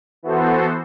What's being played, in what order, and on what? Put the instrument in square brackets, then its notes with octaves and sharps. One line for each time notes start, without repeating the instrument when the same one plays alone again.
[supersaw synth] E3 B3 F#4 A4 C5